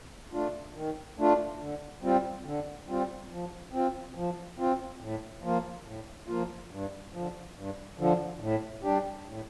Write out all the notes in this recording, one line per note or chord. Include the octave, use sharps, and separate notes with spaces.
A3 D4 F4
D#3
A3 D4 F4
D3
G3 C4 F4
D3
G3 C4 F4
F3
C4 F4
F3
C4 F4
A2
F3 A#3 F4
A2
F3 A#3 F4
G2
D3 F3
G2
D3 F3
A2
G3 D4 G4
A2